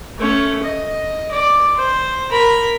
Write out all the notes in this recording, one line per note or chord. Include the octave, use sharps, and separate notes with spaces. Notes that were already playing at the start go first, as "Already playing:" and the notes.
A3 C#4
D#5
D5
C5
A#4 B5